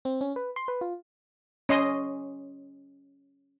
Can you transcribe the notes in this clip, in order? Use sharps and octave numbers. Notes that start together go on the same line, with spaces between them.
C4
C#4
B4
C6
B4
F4
C#4 D#5 C6 D#6